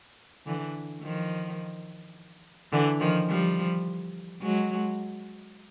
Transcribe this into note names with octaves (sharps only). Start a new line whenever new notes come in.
D3 E3
D#3 F3
D3 E3
D#3 F3
F3 G3
F#3 G#3